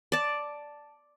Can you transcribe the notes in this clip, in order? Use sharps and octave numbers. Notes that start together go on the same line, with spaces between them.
D5 A5